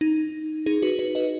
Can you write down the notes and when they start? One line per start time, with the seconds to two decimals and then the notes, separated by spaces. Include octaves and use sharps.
0.01 D#4
0.66 D#4 G#4
0.82 F#4 B4
0.99 F#4 B4
1.15 B4 D#5